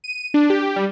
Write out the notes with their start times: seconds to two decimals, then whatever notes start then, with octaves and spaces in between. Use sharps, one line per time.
0.04 D#7
0.34 D4
0.50 G4
0.76 G3